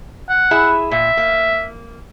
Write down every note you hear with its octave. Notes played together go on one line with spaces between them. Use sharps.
F#5
E4 G#4 E5
A#2 E5
A#3